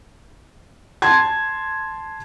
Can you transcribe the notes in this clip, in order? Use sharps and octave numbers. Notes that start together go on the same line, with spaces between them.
A5 C6 G#6